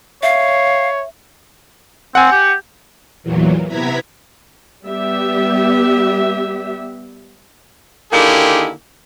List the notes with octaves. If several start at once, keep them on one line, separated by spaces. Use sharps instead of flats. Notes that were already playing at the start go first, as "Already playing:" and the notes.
C#5 E5 F5
C4 F#5 G#5
G4
E2 A#2 E3 F#3
C3 B3 E4 A#5 G#6 B6
G3 B3 G4 E5
D3 D#3 A#3 E4 G4 G#4